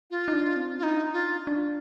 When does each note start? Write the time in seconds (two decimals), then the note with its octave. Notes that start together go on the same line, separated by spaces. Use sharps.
0.11 F4
0.28 D#4
0.33 D4
0.56 C4
0.79 D4 D#4 F4
1.12 F4
1.47 D4